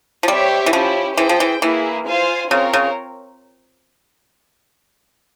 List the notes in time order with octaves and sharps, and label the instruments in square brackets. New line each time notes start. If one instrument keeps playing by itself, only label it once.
[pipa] F3
[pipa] G3 [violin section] C4 G4 C#5 E5
[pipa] E3
[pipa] F3 [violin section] C#4 E4 G4
[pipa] E3 [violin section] G#4 C5 G5
[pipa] F3
E3
[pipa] E3 [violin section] A#3 E4 G#4
[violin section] F4 C5 F5 G#5
[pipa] C#3 [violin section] C4 F4 A#4 C#5
[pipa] C#3